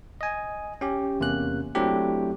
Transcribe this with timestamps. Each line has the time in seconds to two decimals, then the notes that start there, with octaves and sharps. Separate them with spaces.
0.21 D#5 G#5
0.81 C#4 G4
1.20 E2 C3 A#3 C#4 F#6
1.75 F#3 A3 C4 D4 E4 G4